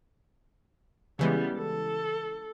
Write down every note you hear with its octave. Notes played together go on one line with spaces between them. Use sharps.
C#3 E3 G3 G#3 B3
A4